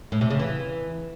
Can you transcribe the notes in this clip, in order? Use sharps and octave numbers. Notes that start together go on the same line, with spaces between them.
A2
C3
C#3
E3